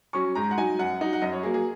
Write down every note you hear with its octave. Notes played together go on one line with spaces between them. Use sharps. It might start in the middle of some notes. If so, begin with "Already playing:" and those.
F#3 C#4 C#6
G#2 A#5
F#5
F#3 D#4 G#5
F#2 F#5
F#3 D#4
F#5
F#2 D#5
C#5
F#3 A#3 G#4
G#4